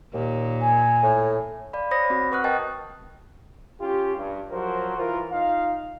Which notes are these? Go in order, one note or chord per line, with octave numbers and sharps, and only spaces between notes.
D#2 A#2
G#5
A2
D5 F5 B5
C5 C#5 B5 D#6 A#6
C4 F#4
B4 F#5 C#6 D#6 F6 F#6
A#4 D#5 G5 A5 A6
C#4 F4 G4
G2
F3 F#3 F#4 A#4 C5
E3 F4 A#4
D#4 F4 F5